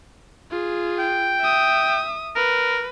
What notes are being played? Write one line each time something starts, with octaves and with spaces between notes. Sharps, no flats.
F4 G#4
G5
E5 D#6
A#4 B4